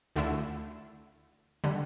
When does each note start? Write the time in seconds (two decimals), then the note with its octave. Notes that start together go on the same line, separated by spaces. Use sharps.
0.16 D2 D3 A3 E4
1.64 D3 G3